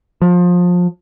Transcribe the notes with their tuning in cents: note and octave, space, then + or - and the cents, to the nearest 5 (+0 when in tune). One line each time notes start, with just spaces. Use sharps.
F3 +25